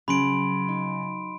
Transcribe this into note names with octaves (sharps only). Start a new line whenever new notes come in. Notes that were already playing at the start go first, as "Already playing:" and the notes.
C#3 F#3 B5 C6 D7
D#4